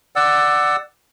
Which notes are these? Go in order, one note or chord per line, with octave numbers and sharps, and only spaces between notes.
D5 F#5 E6